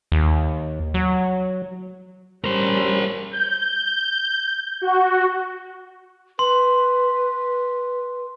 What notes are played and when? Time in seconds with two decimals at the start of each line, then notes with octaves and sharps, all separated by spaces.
0.12 D#2
0.94 F#3
2.44 G3 C#4 A#4 C5
3.32 G6
4.82 F#4
6.39 B4 C6